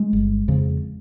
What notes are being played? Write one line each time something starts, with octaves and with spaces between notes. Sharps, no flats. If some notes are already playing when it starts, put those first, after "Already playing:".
Already playing: G#3
G1
F2 C#3